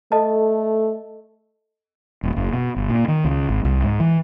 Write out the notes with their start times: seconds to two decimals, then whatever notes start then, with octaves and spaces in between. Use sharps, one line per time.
0.12 A3 A4 D#5 A5
2.23 D#1
2.36 F#1
2.53 B2
2.76 G1
2.89 A#2
3.08 D#3
3.25 C#2
3.49 G#1
3.65 C2
3.84 G#2
4.00 E3